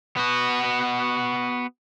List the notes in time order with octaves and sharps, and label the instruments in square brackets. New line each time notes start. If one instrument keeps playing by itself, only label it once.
[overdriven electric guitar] B3 F#4